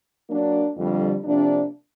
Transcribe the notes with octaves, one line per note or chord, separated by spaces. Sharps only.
F#3 A#3 D4
F2 D3 G3
C3 F3 A#3 D4